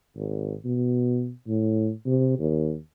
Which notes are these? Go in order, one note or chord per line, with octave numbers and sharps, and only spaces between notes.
G#1
B2
A2
C3
D#2